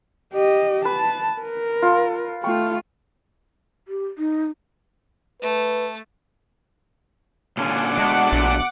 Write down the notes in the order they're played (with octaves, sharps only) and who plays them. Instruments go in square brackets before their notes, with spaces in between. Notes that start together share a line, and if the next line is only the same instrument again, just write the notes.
[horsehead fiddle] G4 D#5
[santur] B4 [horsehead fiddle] A5
[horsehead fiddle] A#4
[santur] F4
[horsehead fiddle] A3 F4 [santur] G5 C#6
[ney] G4
D#4
[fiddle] A3 [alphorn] B4
[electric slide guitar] A#2 D3 C#4 [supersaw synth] F#5 D6
[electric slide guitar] B2 A3 D4 [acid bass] G#3
[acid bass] A#1